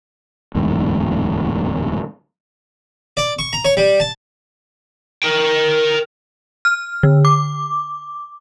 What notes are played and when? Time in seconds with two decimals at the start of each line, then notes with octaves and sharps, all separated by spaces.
0.55 D1 E2 G#2
3.17 D5
3.39 C#6
3.53 A#5
3.65 C#5
3.77 G3
4.00 A5
5.23 A#4 G5
6.65 F6
7.03 D3
7.25 D6